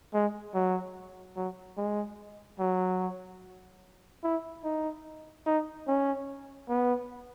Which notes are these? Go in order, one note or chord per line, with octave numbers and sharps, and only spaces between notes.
G#3
F#3
F#3
G#3
F#3
E4
D#4
D#4
C#4
B3